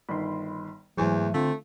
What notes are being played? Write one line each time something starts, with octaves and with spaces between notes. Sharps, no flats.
G1 D#3 B5 C6
E2 G#2 E3 F#3 A3 C5 G#5
D3 A3 C4 F4